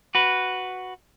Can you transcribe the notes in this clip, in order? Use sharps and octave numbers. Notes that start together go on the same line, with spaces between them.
F#4 B4